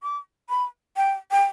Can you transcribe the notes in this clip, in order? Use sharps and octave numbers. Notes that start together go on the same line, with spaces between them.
D6
B5
G5
G5